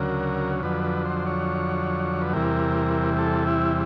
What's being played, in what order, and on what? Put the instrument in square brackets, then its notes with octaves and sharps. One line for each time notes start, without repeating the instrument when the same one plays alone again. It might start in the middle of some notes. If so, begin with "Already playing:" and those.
Already playing: [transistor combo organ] D2 C#3 F#3 A#4
F2 D3 F#3 B4
B4
C5
C#5
B4
E2 C3 E3 G3 A#4
A4
E4